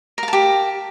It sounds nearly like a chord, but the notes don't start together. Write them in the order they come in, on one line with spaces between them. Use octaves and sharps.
A#4 F5 A5 G4